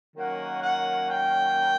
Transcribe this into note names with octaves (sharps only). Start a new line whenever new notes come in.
D#3 F#3 A#3 C#4 F#5
F#5
G5